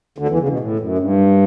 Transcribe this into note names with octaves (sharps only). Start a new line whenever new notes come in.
D2 D3
E2 E3
C#3
B2
A2
F#2
G2